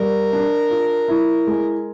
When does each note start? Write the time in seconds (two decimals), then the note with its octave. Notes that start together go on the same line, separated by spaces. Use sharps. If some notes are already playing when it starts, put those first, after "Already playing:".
Already playing: G3 A#4
0.32 D4
0.70 F4
1.08 E4
1.47 G#3